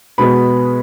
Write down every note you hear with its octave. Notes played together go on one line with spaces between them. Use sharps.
B2 G#3 B3 B5